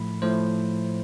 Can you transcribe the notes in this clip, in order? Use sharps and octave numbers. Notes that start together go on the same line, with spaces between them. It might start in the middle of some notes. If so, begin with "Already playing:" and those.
Already playing: A2 F3 A3 B5
A2 F3 A3 C5